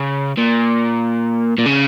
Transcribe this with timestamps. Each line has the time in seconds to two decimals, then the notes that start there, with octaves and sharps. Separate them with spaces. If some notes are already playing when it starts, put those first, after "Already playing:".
Already playing: C#3
0.37 A#2
1.58 A#2
1.66 C#3